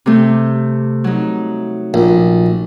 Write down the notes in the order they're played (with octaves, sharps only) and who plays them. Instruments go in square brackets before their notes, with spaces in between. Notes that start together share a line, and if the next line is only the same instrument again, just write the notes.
[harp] C3 A3
F#3 D#4
[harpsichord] A#1